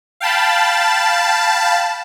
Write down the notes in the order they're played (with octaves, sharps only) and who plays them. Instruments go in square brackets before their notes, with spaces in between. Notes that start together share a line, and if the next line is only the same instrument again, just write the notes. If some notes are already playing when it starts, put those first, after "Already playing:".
[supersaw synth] F5 G5 A5 B5